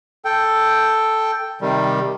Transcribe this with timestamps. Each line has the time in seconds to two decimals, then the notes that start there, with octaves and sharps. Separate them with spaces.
0.25 A4 G5
1.61 C3 D#3 G3